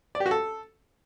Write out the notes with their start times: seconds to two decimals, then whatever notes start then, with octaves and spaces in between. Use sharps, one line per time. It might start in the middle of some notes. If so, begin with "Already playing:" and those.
0.15 D5
0.20 G4
0.26 F#4
0.31 A4